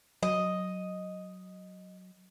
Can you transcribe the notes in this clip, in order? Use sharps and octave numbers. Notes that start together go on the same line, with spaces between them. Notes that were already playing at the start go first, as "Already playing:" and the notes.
F#3 D#5